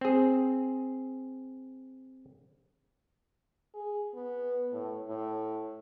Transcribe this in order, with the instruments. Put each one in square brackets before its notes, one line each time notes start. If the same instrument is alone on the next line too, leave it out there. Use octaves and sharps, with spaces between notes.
[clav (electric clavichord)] C4 G#4
[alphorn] G#4
B3
A2
A2